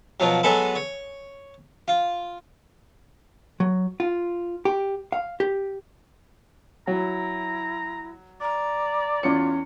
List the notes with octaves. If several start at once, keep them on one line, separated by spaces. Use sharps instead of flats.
B2 F3 F#3
F#3 G#3 B3 G#4 A4 B4
C#5
F4
F#3
F4
G4
F5
G4
F#3 E4 A#5
D5 A#5
E2 C#4 F4 C#5 C#7